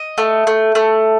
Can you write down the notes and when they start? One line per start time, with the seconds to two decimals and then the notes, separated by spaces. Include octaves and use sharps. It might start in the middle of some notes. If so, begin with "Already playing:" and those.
Already playing: D#5
0.18 A3
0.47 A3
0.75 A3